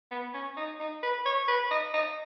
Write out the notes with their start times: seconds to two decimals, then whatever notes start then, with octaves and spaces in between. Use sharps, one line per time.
0.11 B3
0.34 C#4
0.57 D#4
0.79 D#4
1.03 B4
1.26 C#5
1.48 B4
1.71 D#5
1.94 D#5